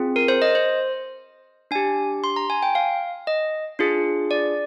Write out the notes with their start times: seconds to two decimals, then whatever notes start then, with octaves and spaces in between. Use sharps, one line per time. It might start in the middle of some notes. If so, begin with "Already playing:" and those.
Already playing: C4 F4 G#4
0.16 A#4
0.28 C5
0.42 D#5
0.55 C5
1.71 D4 G4 G#5
2.24 C6
2.36 A#5
2.50 G#5
2.63 G5
2.75 F5
3.27 D#5
3.79 D4 F4 G#4
4.31 D5